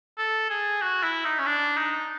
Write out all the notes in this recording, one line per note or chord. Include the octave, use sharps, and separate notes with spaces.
A4
G#4
F#4
E4
D#4
C#4
D4
D#4